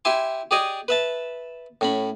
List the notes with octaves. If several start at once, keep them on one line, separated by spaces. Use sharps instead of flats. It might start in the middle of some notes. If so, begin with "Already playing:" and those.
E4 G4 E5 G#5 C6
G4 G#4 D5 D#5 G#5
B4 E5 A5
A2 C#4 B5